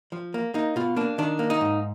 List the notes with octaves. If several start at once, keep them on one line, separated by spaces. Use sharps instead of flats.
F3
A#3
A#3 D#4
B2 F4
A#3 D4
D#3 D4
A#3
D#4
G#2